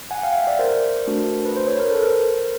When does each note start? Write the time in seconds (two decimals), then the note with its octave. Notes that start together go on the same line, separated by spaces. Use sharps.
0.11 F#5 G#5
0.23 F5 G5
0.35 E5 F#5
0.47 D5 E5
0.59 A#4 C5
1.07 A3 D4 F#4
1.45 B4
1.56 C5
1.67 B4 C#5
1.79 A#4
1.91 A4 B4
2.03 A#4 C5